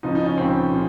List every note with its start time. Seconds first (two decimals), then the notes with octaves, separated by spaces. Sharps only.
0.03 C#2 C#3 F3 D#4
0.15 D#4
0.26 C#4
0.38 C#2 C#3 F3 C4
0.73 C#3 F3